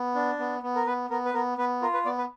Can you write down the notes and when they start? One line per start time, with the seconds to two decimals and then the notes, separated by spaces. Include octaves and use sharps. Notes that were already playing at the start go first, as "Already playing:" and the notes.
Already playing: B3
0.15 D4
0.39 B3
0.63 B3
0.76 A#4
0.86 B3 B4
1.10 B3 A#4
1.25 B4
1.34 B3 A#4
1.58 B3 B4
1.82 F4 A#4
1.94 B4
2.05 B3 D5
2.18 B4